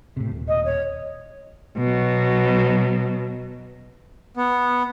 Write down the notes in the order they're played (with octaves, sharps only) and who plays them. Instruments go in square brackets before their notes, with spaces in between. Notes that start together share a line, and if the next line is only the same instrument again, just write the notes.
[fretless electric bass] A2 C3
D#1
[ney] D#5
C#5
[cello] B2 F#3
[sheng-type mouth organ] B3